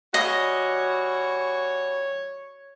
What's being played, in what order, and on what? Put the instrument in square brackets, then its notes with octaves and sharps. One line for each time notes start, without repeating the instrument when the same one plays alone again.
[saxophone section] E3 G3 F#4 [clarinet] C#5 [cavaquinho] D#5